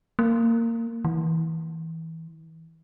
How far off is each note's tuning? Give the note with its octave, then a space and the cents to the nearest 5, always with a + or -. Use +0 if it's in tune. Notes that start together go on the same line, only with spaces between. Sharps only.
A#3 -20
E3 -25